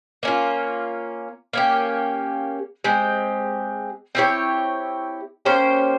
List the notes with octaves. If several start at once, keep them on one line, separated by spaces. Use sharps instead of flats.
A#3 C#4 F4
A#3 C#4 G4
G#3 C4 G4
C4 E4 G4 C#5
A#3 C#4 G4 C5